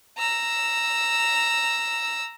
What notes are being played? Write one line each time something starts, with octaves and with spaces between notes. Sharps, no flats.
A#5 E6